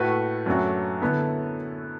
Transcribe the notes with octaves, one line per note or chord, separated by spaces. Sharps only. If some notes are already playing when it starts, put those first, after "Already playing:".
Already playing: A2 A3 F#4 B4
F#2 F#3 A3 D4 F#4
D3 B3 E4 A4